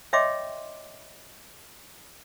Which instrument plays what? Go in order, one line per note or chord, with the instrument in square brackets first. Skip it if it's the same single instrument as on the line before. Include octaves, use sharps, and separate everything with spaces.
[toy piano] C#5 D#5 E5 G5 C6 D6